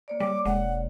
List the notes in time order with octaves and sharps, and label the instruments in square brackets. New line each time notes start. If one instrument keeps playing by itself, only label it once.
[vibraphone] A#3 C#5 D5
[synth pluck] G3 [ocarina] D6
[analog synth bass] E1 [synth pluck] G#3 [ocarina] F#5